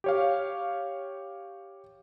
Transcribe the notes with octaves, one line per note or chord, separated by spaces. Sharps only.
G4 C#5 F5